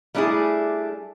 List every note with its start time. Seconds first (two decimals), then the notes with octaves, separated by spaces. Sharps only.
0.15 G3 A3 D4 E4 G#4